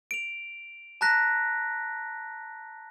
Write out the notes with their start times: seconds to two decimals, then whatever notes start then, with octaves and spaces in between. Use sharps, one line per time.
0.11 D7 F7
1.01 A5 A#5 F#6 A#6 B6